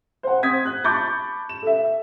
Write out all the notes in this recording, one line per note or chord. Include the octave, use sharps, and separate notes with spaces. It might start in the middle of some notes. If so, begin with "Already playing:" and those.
C5 F#5
C4 D#6 G#6 B6
F#6
A5 B5 C#6 D6 G6 A6
E7
A4 E5